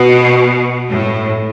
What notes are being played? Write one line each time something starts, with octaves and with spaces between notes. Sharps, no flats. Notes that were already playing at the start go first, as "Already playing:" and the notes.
Already playing: B2
A2